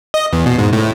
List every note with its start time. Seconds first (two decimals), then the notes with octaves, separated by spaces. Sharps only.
0.14 D#5
0.33 E2
0.46 B2
0.58 G#2
0.73 A2